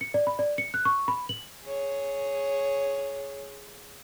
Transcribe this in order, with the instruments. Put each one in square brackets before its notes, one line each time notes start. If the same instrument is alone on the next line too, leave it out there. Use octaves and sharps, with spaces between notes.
[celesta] C#7
D5
B5
D5
C#7
F#6
C#6
B5
F#7
[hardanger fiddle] G#4 C#5